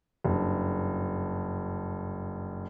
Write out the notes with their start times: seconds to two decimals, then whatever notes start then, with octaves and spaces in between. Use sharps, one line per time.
0.24 F#1 G2